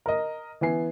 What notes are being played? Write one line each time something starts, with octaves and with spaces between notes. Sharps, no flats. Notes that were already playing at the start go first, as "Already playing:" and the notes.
A#4 D#5
E3 B3 G#5 C7